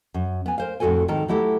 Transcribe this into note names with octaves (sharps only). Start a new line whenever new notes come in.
F#2
B3 G#5
A#4 C5 F5
F2 A2 E3 F#4 A4 G#5
G#2 D#3 A4 A#4 A5
F#3 A3 E4 G4 A4